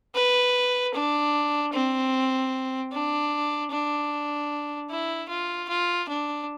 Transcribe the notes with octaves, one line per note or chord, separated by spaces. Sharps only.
B4
D4
C4
D4
D4
E4
F4
F4
D4